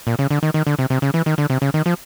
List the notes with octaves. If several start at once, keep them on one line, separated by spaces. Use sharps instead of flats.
A#2
C#3
D3
D#3
D#3
D3
C3
C3
C#3
E3
D#3
D3
C3
C#3
D#3
F3